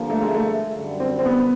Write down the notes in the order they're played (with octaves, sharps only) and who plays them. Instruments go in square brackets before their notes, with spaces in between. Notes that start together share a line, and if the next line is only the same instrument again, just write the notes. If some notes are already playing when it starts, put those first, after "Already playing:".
Already playing: [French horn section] G2 D3 F3 A#3
[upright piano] A3
G#3
A3
[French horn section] F#2 D3 G3
[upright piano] C4
C4
B3